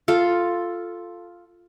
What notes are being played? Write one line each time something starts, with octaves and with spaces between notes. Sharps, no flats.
F4 A4